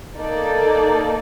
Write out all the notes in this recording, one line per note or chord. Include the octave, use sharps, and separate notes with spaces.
A#3 D#4 A4 D5